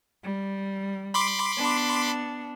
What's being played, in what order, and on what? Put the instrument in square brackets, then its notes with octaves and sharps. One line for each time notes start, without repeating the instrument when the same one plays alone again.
[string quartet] G3
[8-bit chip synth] B5 C6 D6
[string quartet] B3 D4